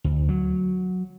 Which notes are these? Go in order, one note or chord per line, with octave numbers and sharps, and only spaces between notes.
D2
F#3